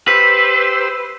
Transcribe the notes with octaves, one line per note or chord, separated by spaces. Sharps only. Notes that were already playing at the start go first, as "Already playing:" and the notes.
G4 B4 C5 E6